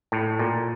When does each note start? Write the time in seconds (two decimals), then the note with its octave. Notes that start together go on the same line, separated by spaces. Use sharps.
0.12 A2
0.39 A#2